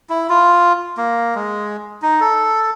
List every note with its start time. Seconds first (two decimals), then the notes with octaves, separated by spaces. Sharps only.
0.10 E4
0.29 F4
0.97 A#3
1.35 G#3
2.02 D#4
2.21 A4